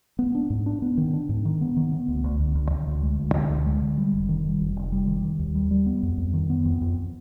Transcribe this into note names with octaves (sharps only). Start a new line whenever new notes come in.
B3
D4
G#2
D4
B3
D#3
D4
G#2
D#3
B3
D#3
B3
D2
D2
D2
D2
D3
D2
G#3
D2
D3
D2
G#3
D3
G3
F1
D#3
G3
F1
F1
G3
D#3
D#3
D#2
G3
G3
B3
F2
F2
D#3
B3
F2
F2